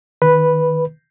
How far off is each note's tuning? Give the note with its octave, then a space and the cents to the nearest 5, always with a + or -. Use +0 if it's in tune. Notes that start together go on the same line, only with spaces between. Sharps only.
D#3 +0 B4 -5